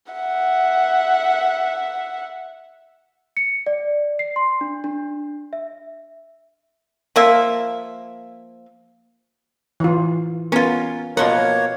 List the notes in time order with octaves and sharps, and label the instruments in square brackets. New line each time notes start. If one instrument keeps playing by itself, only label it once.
[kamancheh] E5 F#5
[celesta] C#7
D5
C7
C6
D4
D4
E5
[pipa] F3 A#3 E5
[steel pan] E3 F4
[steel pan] B3 A#4 [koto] C#4 F4
[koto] B2 F3 F#5 [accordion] A#3 C#5 [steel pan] A#4